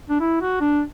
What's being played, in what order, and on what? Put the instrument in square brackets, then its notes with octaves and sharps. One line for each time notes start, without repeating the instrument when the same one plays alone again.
[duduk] D4
E4
F#4
D4